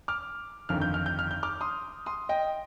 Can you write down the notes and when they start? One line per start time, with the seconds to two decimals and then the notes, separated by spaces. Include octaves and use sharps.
0.08 D6 F6
0.69 G1 F2 D#3 F6
0.81 G6
0.94 F6
1.06 G6
1.19 F6
1.31 G6
1.43 D6 F6
1.61 C6 D#6
2.06 C6 D#6
2.29 D#5 G5